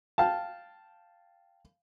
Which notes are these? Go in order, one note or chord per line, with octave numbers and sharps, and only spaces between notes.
F5 G5 A5